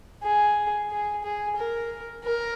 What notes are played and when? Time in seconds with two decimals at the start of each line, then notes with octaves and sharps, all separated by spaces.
0.23 G#4
0.91 G#4
1.24 G#4
1.57 A#4
2.24 A#4